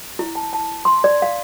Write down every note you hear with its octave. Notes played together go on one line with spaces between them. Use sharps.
E4
A5
A5
C6
D5
F5